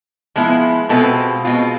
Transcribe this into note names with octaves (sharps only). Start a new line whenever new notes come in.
F3 G#3 B3 E4
B2 G#3 C4 F4 A4 B4
B2 G#3 C4 F4